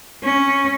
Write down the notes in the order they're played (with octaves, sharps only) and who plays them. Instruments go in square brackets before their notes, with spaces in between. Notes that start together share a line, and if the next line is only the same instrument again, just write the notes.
[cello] C#4